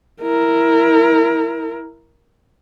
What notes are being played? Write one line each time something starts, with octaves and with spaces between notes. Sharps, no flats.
E4 A#4